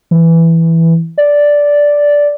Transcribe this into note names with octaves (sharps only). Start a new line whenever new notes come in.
E3
D5